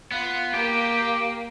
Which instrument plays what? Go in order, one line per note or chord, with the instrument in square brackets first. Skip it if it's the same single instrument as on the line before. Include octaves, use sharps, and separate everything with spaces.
[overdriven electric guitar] B3 [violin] F4 F5
[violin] A#3 [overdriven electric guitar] G4 G5